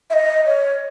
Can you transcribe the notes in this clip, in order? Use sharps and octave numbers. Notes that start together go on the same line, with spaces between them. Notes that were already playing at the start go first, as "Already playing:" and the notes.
E5
D#5
C#5